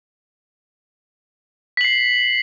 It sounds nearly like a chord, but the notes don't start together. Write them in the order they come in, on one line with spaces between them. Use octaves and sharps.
B6 F#7 C7